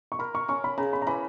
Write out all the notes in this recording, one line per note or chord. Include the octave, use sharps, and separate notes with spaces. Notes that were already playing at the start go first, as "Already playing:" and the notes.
C#6
A#4 B5
C#6
C#4 C#6
B5
C#3 A#5
B5
A#5
E3 B5